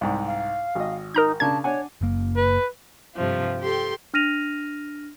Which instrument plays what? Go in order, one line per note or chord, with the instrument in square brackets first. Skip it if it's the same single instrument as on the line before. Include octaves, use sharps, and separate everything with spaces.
[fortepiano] C2 G#2
[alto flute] F5
[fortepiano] G#1 D#5
[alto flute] D#4 [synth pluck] A#4 A#5 G6
[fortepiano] C#3 D4 A#4 [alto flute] A5 [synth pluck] G#6
[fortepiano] D4 F#5 G#5 [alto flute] C#5
[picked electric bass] F#1 A#3
[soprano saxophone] B4
[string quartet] G2 C3 F3 A3 F4
G4 A4 G5 C6
[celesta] D4 F6 A#6 D#7 F7